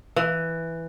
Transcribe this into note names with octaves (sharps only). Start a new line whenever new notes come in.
E3